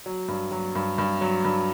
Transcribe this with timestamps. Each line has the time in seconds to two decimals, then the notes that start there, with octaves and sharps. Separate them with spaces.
0.06 F#3
0.28 G2
0.51 F#3
0.75 G2
0.98 G2
1.21 F#3
1.44 G2